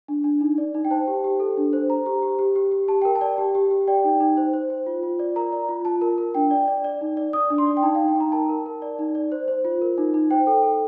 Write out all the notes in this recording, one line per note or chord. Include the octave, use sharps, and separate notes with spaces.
D4
D4
D#4
D5
D#4
G5
C5 A5
G4
G4
A4
D4
C5
C5 A#5
G4
G4
G4
G4
G4
G4 A5
A#4 G5
A5
D5
G4
G4
G4
D5 G5
D#4
D#4
C5
C5
C5
F4
F4
D5
A#4 A#5
D5
F4
F4 A5
A#4
A#4
D4 G5
D5
D5
D5
D#4
D5
D5 D#6
D4
C6
D5
G5
D#4 A5
F5
D#4
G5
D#4 A#5
A#4 A5
A#4
A#4
D5
D#4
D5
C5
C5
F4
A#4
D#4
D#4
C5 G5
A4
A4